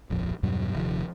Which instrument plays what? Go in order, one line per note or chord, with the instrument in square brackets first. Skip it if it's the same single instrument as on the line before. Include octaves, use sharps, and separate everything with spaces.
[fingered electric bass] D1 A#1 F2
E2 G2 B2 F#3
D#1 C3 D#3 F3